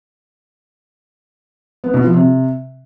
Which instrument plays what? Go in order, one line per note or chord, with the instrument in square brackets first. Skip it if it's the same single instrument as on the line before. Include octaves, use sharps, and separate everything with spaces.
[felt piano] B3
B2
F3
C3